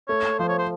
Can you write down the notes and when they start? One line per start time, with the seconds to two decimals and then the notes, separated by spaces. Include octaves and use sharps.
0.08 A3 C#5
0.39 F3 C5
0.49 C#5
0.59 C5